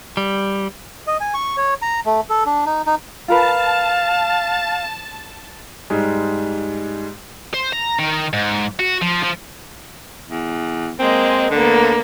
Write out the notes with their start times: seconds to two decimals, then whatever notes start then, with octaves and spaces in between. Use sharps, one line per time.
0.17 G3
1.07 D#5
1.21 G#5
1.34 C#6
1.57 C#5
1.82 A#5
2.06 A3
2.30 A4
2.46 D4
2.66 D#4
2.87 D#4
3.28 F4 A#4 B4 F5 A5
5.90 G#2 G3 G#3
7.54 C5
7.73 A#5
7.99 D#3
8.33 G#2
8.79 F#4
9.02 F3
9.22 F3
10.30 E2
10.99 G#3 A#3 C4
11.51 D2 D3 A#3 B3